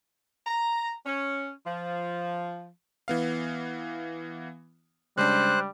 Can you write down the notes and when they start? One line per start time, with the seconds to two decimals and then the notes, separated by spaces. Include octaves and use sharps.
0.47 A#5
1.06 C#4
1.66 F3
3.08 E3 B3 F5
5.17 C#3 G3 G#3 D4 C5 F#6